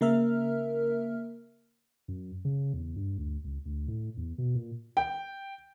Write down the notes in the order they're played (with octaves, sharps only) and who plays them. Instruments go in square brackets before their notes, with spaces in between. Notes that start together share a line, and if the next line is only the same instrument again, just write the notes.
[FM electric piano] C#3 A#3 A#4 E5 F6
[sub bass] F#2
C#3
E2
G2
D2
C#2
D2
A2
E2
B2
A#2
[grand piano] G5